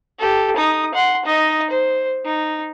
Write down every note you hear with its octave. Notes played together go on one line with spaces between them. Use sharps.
G4 A4
D#4 D#6
F#5 C6
D#4 D#5
C5
D#4